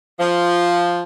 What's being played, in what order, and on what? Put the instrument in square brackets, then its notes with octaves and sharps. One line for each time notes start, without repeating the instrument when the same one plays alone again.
[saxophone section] F3